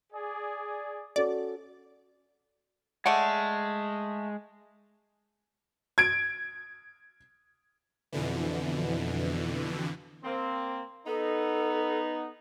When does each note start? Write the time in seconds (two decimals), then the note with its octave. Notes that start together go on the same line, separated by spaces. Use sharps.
0.13 G#4 D5
1.16 C#4 F#4 A4 D5
3.06 G#3 A3 D5 F#5
5.98 G#6 D7
8.13 F2 B2 D3 E3
10.24 A#3 C4
11.07 B3 D#4 A4